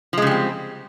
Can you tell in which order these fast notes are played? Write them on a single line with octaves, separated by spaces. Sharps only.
F3 G#3 C#3 G3 C4